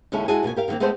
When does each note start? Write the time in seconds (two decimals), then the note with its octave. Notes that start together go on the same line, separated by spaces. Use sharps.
0.12 D#2 C#3 G#3 C#4 E4 A4
0.28 G#3 E4 F#4 G#4 G#5 A5
0.43 F2 B2 A#3 G#5
0.56 G4 A#4 F5
0.68 D3 D#3 F3 A#3 C4
0.80 G#3 A3 B3 C4 A4 C5